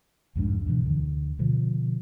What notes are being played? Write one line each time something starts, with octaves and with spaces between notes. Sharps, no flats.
C2 F2 G#2 D4
E2 B2 E3
D2 D3
B2 D3 F3